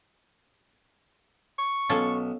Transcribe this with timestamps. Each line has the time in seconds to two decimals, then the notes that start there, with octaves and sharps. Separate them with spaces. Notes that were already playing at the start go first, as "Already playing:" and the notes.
1.59 C#6
1.90 B1 C#4 F4 A4